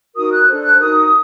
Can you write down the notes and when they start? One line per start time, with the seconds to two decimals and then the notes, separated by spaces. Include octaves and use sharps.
0.16 D#4 F#4 A#4 D#6
0.32 F#6
0.48 D4 A4 C5
0.63 F#6
0.79 D#4 F#4 A#4 D#6